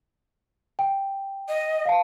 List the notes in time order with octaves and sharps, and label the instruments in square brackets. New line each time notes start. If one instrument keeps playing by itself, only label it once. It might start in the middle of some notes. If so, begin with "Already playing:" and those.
[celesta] G5
[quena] D#5
[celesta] F5 A5